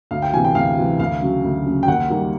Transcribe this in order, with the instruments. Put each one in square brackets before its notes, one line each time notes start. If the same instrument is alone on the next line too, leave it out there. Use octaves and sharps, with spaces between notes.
[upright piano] D2 F5
G5
C3 E3 G#5
G5
D2 F5
C3 E3
D2 F5
C#3 F#3
D2
C#3 F#3
G5
D#2 F#5
D#3 G3 A#3